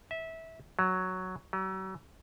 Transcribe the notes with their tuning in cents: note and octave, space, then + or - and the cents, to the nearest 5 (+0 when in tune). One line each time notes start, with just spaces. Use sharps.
E5 -20
F#3 +0
F#3 +40